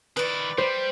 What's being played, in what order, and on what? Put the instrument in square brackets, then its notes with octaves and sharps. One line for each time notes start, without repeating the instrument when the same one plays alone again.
[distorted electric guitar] D#3 E4 [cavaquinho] B4 D5
[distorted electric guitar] G3 [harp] C5